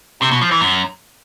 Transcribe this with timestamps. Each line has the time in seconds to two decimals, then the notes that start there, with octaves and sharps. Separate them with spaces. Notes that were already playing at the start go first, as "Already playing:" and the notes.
0.22 C3
0.31 B2
0.41 F3
0.51 E3
0.61 F#2